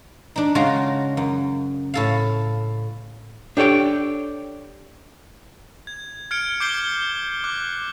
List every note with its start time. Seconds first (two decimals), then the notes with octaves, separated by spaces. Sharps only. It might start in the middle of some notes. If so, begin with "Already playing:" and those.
0.36 D4 D#4
0.55 C#3 G#3 F4 F#4 A#5
1.17 F#2
1.94 A2 A4 F5
3.57 D4 G4 A4 C#5 G5
5.87 G#6
6.31 F6 G#6 C#7 D7
6.60 D6 G6 C7 D7 G7
7.44 D6 F#6